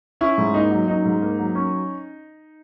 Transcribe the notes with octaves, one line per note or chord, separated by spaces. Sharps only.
C#4 E4
G#2
A#3 D#4
F#3
C#4 D#4
G#2
A#3
F#3
C#4